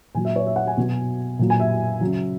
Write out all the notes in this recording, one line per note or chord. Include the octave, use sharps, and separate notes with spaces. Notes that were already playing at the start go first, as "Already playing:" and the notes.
A#2 F#3 G#5
E5
C#5
E5
F#5
G#5
B2 F#3
A#2 F#3
G#5
E5
C#3 F#3